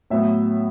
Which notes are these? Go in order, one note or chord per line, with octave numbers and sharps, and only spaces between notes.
A2 F#3 B3 E5